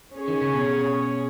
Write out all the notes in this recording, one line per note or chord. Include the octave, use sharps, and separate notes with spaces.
C#4 G#4 C#5
D#3
C#3
B2